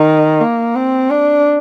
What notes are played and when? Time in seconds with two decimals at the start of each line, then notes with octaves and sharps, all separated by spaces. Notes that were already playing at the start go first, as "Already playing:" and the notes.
Already playing: D#3
0.41 A#3
0.75 C4
1.10 D4